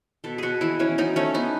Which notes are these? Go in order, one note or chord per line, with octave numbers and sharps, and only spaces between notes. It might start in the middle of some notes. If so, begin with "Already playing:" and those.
B2 A4
B2 F#4 G#4
E3 E4
E3 C#4
F#3 D#4
A3 C#4
B3 D#4